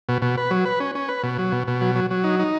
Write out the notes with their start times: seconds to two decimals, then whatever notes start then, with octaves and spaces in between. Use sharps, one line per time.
0.09 B2
0.22 B2
0.37 B4
0.51 F#3
0.65 B4
0.80 C#4
0.95 C#4
1.08 B4
1.23 B2
1.38 F#3
1.52 B2
1.67 B2
1.81 F#3
1.95 F#3
2.10 F#3
2.24 D#4
2.39 D#4